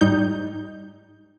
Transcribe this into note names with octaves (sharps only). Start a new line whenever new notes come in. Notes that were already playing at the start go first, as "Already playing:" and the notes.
G#2 G3 D#4 G6